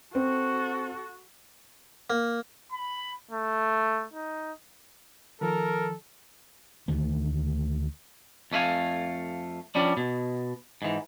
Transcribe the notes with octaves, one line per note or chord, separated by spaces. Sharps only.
C4 F#4 A4
A#3
B5
A3
D#4
D#3 F3 A4 A#4
D2 D#3 A3
F2 A3 C#4 F5 G#5
F3 G3 C#4 D4
B2
G#2 E3